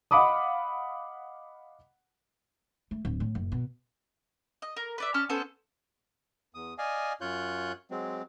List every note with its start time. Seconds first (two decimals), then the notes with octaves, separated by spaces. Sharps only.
0.11 D#5 F5 F#5 B5 D6 D#6
2.91 A3
3.05 D1
3.20 A2
3.35 F#1
3.52 B2
4.62 D#5
4.77 A#4
4.98 B4 D5 E5
5.14 C#4 A5 F6
5.29 B3 C#4 A4 C5
6.54 E2 D#6
6.78 D5 D#5 F5 G#5
7.21 F#2 F4 C#5 F#6 G6
7.91 F#3 G#3 C4